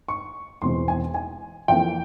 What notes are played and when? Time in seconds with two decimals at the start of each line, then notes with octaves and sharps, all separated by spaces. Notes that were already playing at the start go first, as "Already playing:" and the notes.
0.08 C#6
0.62 E1 E2 E3 G#3 C4 C6
0.88 G#5
1.14 G#5
1.68 F2 E3 A#3 G5